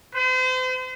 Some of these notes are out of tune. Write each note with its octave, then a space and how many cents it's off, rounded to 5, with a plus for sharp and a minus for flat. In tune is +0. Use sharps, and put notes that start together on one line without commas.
C5 -40